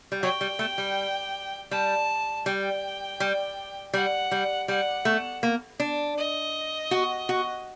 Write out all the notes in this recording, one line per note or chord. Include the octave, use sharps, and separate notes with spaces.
G3
F#3 G5
G3
A3
G3
G3 A5
G3 G5
G3
G3 F#5
G3
G3 F#5
A3
A#3
D4
D#5
F#4
F#4